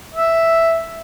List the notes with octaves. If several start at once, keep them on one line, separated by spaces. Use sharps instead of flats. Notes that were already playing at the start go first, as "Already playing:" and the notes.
E5